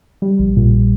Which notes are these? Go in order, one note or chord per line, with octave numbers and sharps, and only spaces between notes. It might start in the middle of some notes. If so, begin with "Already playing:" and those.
G3
A#1
A#2